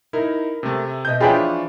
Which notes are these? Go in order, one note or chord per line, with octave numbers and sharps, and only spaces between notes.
D#4 E4 A#4
C3 A3
B2 D#5 E5 G6
E3 F3 D4 F4 G#4 C#5 G5 B5